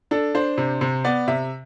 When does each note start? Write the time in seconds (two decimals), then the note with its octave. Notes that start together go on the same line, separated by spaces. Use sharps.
0.11 D4 A4
0.35 D4 C5
0.58 C3
0.81 C3
1.04 B3 D5
1.27 C3 E5